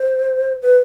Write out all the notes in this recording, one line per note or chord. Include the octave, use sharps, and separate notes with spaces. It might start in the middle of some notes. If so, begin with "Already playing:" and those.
Already playing: C5
B4